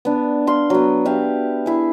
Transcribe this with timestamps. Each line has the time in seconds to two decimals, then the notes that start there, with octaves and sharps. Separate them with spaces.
0.05 B3 D4
0.47 F5 C6
0.70 F#3 B3
1.06 G4 E5 F5
1.66 E4 G#4